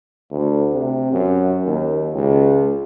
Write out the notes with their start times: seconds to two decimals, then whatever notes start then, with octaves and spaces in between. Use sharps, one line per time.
0.31 D2
0.73 C3
1.13 F#2
1.65 D#2
2.13 C#2